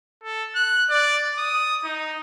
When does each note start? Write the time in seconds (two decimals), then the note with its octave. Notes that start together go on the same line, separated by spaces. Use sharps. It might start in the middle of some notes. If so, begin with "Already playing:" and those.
0.24 A4
0.55 F#6
0.90 D5
1.38 D#6
1.84 D#4